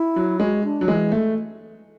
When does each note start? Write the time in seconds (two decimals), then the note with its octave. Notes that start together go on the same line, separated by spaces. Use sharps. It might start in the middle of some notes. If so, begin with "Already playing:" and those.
Already playing: E4
0.16 F#3
0.40 G#3 F#4
0.64 D4
0.81 F#3
0.88 E3 G#3
1.12 A3